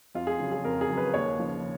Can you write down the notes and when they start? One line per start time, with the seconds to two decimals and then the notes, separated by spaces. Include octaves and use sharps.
0.15 F2 F4
0.27 G#4
0.40 C#3 F#3
0.52 G#4
0.64 F2 A#4
0.81 G#4
0.90 C#3 F#3
0.97 B4
1.14 D#2 C#5
1.39 C#3 F3